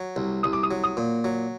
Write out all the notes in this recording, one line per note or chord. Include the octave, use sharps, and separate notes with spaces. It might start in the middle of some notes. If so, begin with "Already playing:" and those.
Already playing: F#3
C2
C2 D#6
D6
D#6
F#3
D#6
A#2
F#3